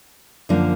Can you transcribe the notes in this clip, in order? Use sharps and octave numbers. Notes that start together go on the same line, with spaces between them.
F#2 D3 F3 A#3 D4